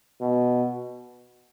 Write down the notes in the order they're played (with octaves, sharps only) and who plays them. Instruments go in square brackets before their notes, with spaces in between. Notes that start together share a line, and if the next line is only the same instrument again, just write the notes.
[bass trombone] B2